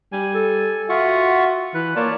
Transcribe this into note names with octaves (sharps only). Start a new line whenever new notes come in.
G3 G#5
A4
F4 F#4 E5 C#6
E3 B4
A#3 F4 C#5 D5 A5